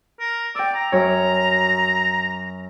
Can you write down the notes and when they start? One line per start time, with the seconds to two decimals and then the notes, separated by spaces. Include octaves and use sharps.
0.20 A#4
0.55 D5 G5 E6
0.74 A#5
0.92 F#2 C#5 A#5